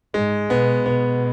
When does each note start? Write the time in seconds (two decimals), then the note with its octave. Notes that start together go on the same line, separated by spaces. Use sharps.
0.14 G#2 G#3
0.50 B2 B3
0.86 B2 B3